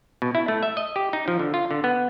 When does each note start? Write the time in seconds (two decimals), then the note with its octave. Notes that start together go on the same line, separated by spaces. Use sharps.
0.22 B2
0.35 E4
0.48 A3
0.63 E5
0.77 D#5
0.96 G4
1.13 D#4
1.28 F3
1.39 D3
1.54 F4
1.71 D3
1.84 B3